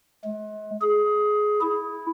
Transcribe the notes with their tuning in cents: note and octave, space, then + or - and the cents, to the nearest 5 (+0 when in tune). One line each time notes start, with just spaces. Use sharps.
G#3 +40
G#4 +15
E4 -5